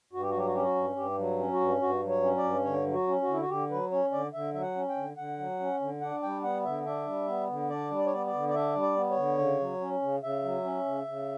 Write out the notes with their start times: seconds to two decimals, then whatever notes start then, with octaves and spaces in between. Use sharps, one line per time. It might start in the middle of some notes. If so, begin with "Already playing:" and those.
0.13 G2 F#4
0.21 G4
0.29 F#4
0.34 F#3 G4
0.46 F#4
0.54 C#4 G4
0.62 F#4
0.75 G2
0.96 G2 G4
1.17 F#3
1.39 C#4
1.53 F#4
1.60 G2
1.81 G2 F#4
2.02 F#3
2.09 C#5
2.22 C#4
2.38 D5
2.43 G2
2.64 D3 C#5
2.87 F#3
2.93 F#4
3.07 C#4
3.22 F#4
3.28 D3 E4
3.40 F#4
3.49 D3 G4
3.71 F#3 B4
3.91 C#4 C#5
4.12 D3 D5
4.33 D3 E5
4.54 F#3 E5
4.62 F#5
4.76 C#4
4.89 G5
4.96 D3
5.17 D3 F#5
5.39 F#3
5.60 C#4
5.81 D3
6.01 D4 F#5
6.23 G3 G5
6.43 B3 F#5
6.64 D3 E5
6.85 D4 E5
7.07 G3
7.28 B3
7.50 D3
7.70 D4 D5
7.90 G3
7.98 D5
8.06 C#5
8.13 B3 D5
8.27 D5
8.34 D3
8.48 D5
8.54 D4 E5
8.75 G3
8.82 D5
8.97 B3
9.11 C#5
9.17 D3
9.38 C#3
9.60 F#3
9.81 C#4
10.02 C#3
10.23 C#3 E5
10.44 F#3
10.64 C#4
10.85 C#3
11.07 C#3